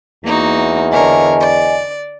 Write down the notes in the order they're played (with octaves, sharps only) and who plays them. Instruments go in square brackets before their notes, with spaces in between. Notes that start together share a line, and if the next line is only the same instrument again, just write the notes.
[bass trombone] E2 [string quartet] A#3 D#4 F#4
[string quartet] D3 A#4 C#5 [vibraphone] D#5 G#5
[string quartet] D5